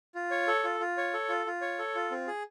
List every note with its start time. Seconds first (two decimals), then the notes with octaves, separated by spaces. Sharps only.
0.15 F4
0.31 C#5
0.47 A4
0.64 F4
0.80 F4
0.97 C#5
1.14 A4
1.29 F4
1.46 F4
1.61 C#5
1.79 A4
1.95 F4
2.11 C4
2.27 G#4